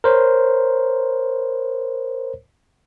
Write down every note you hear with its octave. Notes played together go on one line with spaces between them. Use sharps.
A#4 C5 C#5